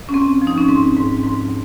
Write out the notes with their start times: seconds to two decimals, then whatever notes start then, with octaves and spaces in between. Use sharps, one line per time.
0.09 C#4
0.14 G#2 C4
0.42 F3
0.47 D#4
0.58 C#4
0.68 G#2 C4
0.96 G#2
1.24 G#2